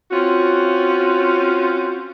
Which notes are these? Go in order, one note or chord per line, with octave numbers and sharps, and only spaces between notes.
C4 C#4 F4 F#4